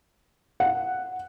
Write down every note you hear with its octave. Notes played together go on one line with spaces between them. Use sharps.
F#5